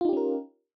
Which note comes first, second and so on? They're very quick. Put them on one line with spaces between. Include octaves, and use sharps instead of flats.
F4 D#4 G4 C#4 A#4